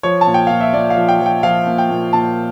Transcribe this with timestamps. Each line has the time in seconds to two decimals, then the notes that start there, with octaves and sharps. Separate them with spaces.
0.03 F3 C#5
0.21 A5
0.27 A#2
0.34 G5
0.47 A#2 F5
0.61 E5
0.73 A#2 D5
0.90 F5
0.97 F3
1.09 G5
1.20 F3
1.26 G5
1.43 F3 F5
1.67 A#2
1.78 G5
1.90 A#2
2.13 A#2 A5